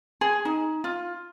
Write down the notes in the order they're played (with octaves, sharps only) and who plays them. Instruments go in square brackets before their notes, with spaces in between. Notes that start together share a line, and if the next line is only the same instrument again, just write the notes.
[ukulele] G#4
D#4
F4